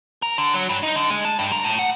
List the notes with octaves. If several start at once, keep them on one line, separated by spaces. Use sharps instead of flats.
A#4
D3
F#3
G2
D#4
D3
G#3
A5
G2
A#4
A2
F#5